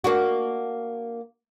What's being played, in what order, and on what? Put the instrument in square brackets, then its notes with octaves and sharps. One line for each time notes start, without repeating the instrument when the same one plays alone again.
[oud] A#3 D4 F#4